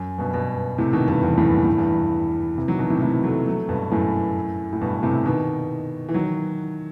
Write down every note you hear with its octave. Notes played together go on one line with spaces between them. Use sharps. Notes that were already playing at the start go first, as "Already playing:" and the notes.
Already playing: F#2
G2 B2
G2 B2
A2 C3
B2 D#3
G2 B2
E2 G2
F#2 A2
G2
A2
E2 G2
C3 E3
D#3 F#3
B2 D#3
A2 C3
A2 C3
F#3 A3
F#3 A3
G2 B2
F#2 A2
A2
G2 B2
A2 C3
B2 D#3
E3
D#3 F#3